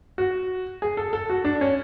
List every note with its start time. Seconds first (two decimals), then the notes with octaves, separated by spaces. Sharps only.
0.18 F#4
0.82 G#4
0.97 A4
1.13 A4
1.30 F#4
1.44 D4
1.61 C#4